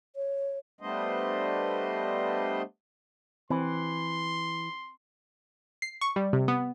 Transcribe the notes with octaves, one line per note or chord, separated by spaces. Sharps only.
C#5
G3 A3 B3 D4 C5 D#5
E3 C4 C6
C7
C#6
G3
C3
B3